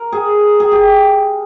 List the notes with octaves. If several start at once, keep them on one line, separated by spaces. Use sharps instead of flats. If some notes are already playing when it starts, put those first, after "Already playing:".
Already playing: A#4
G#4
G#4
G4